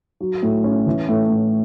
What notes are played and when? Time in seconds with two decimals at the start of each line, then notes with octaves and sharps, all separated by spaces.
0.20 F#3
0.43 A2
0.64 C#4
0.87 E3
1.09 A2
1.30 A2